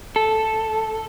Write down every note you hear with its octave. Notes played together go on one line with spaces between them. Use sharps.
A4